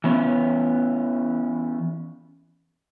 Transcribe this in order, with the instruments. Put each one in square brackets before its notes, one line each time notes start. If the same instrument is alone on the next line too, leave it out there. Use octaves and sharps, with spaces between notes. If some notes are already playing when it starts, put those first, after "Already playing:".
[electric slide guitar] E3 B3 C#4